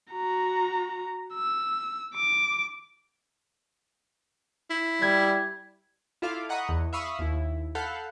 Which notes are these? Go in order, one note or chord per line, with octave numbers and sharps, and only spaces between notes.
F#4 A#5
E6
D6
E4
G3 G#6
E4 F4 A4 F5 D6
D#5 F#5 A#5 B5 C#6 D#6
E2
E5 F5 B5 C#6 D#6 E6
D#2 E4
A4 F5 F#5 B5 F#6 G6